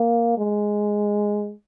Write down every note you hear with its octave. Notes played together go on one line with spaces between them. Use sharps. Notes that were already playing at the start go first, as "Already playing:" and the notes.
Already playing: A#3
G#3